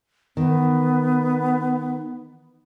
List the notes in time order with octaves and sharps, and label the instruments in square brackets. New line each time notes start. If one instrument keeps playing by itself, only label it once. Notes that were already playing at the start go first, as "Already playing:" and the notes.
[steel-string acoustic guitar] D#3 [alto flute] B3